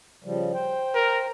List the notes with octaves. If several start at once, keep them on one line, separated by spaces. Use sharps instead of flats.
C#3 F3 G3
C5 G5
A#4